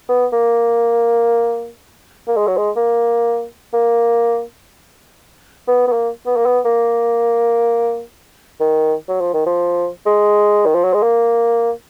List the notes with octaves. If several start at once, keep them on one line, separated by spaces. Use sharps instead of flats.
B3
A#3
A#3
G#3
F#3
G#3
A#3
A#3
B3
B3
A#3
B3
A#3
B3
A#3
D#3
F#3
F3
D#3
F3
G#3
D#3
F3
F#3
G#3
A#3